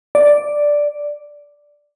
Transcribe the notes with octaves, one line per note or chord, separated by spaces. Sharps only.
D5